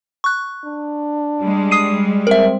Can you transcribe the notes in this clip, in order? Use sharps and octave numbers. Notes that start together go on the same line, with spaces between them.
C#6 F#6
D4
G3 G#3
D#6 C7 D#7
C4 A#4 E5